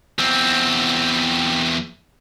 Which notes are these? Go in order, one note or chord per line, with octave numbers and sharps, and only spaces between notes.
E2 C4